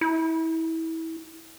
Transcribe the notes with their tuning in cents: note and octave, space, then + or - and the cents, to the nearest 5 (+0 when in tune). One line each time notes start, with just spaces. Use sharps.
E4 -25